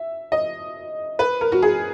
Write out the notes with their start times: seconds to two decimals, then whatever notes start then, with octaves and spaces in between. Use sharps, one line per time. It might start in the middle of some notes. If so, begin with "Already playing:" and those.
Already playing: E5
0.32 D#5
1.19 B4
1.41 A#4
1.52 F#4
1.62 G#4